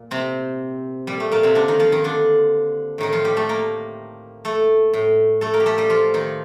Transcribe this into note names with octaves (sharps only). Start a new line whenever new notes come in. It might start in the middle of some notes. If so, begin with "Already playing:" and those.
Already playing: A#2
C3 C4
A#2 G3
A3
A#2 A#3
C3 C4
D3 D4
D#3 D#4
F3 F4
D#3 D#4
D3 D4
A2 D#3 D#4
F3 F4
G3 G4
A3 A4
A#3 A#4
A3 A4
A2
A3 A4
A#3 A#4
G4
A3 A4
G3 G4
F3 F4
D#3 D#4